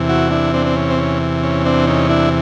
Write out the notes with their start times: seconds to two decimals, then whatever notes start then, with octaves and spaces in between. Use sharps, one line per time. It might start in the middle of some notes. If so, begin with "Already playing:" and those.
Already playing: E2 C3 E3
0.09 E4 F#4
0.31 D4 E4
0.54 C4 D4
0.67 C4
0.76 C#4
0.90 C4
0.98 C#4
1.43 C#4
1.66 C4 D4
1.87 C#4 D#4
2.09 D4 E4